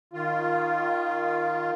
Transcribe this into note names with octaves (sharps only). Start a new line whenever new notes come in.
D#3 F4